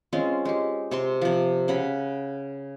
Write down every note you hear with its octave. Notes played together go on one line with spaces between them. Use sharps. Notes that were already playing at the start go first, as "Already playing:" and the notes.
G#3 C4 C#4 F4
G#3 G4
C3 C4 C6
C3 F3
C#3 F#5 B5